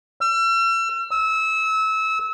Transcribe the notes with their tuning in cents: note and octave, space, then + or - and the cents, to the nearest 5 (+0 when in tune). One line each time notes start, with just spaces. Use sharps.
E6 +40
E6 -25